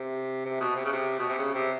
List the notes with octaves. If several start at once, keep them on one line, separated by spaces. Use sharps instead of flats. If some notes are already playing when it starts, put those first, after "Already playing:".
Already playing: C3
C3
B2
C3
C#3
C3
B2
C3
C#3
C3